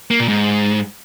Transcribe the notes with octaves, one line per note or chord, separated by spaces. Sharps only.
A#3
A#2
G#2